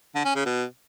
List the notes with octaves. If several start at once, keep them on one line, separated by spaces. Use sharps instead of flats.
D3
C#4
C#3
B2